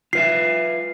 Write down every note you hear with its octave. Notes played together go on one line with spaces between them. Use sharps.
F4 B4 E5 C7